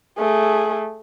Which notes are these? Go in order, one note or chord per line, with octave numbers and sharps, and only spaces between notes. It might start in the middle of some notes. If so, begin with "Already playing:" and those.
A3 G#4